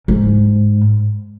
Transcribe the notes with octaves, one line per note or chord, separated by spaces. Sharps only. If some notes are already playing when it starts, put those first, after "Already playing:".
G#2